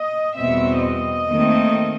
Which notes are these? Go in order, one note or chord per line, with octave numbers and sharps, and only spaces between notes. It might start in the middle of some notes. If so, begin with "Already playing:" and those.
Already playing: D#5
E2 B2 G3 C4 E5
D#5
D#2 D#3 A3 C4